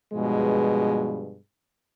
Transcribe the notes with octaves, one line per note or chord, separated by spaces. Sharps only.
G2 B2 F3 G#3 G#4